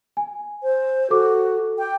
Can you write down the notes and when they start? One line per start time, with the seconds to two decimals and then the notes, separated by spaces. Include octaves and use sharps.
0.17 G#5
0.63 C5
1.10 F#4 A4 D6
1.78 G5